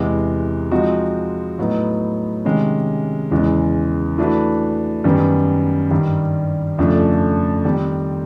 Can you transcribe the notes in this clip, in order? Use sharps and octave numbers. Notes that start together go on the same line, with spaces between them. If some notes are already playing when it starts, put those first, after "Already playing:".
Already playing: E2 C3 E3 G#3
F3 G#3 C4 D#4 F#4
A2 F#3 B3 D#4
C3 D#3 G#3 C#4
E2 C#3 E3 G#3
E3 A3 D4 F#4 B4
F#2 D#3 G3 B3
G2 D#3 G3
F2 C#3 F3 A3 D4
D#3 G3 C4